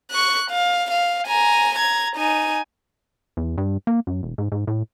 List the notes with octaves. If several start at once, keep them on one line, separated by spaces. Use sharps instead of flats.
C#6 F#6
F5
F5
G#5 A#5
A#5 G#6
D#4 G#5
E2
G2
A#3
F#2
E1
G#2
G#2
A2